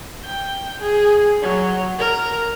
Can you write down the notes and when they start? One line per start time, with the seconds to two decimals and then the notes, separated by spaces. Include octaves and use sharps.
0.24 G5
0.82 G#4
1.43 F#3
1.99 A#4